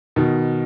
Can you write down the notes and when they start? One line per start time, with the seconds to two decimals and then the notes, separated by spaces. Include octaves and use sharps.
0.16 B2 D#3